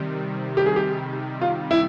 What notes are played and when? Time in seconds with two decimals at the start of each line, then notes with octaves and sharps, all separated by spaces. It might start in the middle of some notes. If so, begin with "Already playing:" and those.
Already playing: C3 D#3 G3
0.57 G4
0.66 G#4
0.76 G4
1.41 F4
1.71 E4